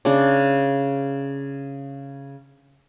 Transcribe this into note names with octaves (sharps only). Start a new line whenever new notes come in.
C#3 D4